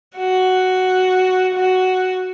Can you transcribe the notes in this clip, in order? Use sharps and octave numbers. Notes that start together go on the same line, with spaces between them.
F#4
F#4